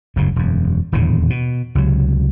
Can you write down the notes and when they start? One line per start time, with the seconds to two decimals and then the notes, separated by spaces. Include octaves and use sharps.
0.16 F#1 D2 G#2
0.36 E1 F#2
0.92 D#1 E2 A2 D3
1.30 B2
1.75 C#2 C3 F#3